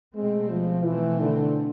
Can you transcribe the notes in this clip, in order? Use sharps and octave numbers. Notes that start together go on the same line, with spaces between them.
B2 G#3 A3 C4
F3
B2 E3 A3 C4
D3